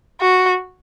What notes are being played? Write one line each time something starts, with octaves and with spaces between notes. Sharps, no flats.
F#4